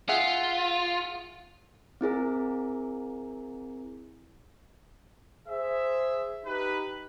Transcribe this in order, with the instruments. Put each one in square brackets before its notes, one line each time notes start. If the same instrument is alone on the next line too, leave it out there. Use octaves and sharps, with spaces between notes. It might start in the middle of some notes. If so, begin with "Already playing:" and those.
[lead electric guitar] F4 [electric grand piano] G#4 E5 F#5
[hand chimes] C4 E4 G#4 A#4
[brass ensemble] G#4 C5 E5
D#4 G4 B4